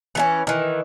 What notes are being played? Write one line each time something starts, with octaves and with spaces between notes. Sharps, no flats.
E3 A3 C#4
D#3 E3